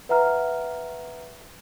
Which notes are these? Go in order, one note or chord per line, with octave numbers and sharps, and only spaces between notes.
B4 E5 F#5 A#5 F6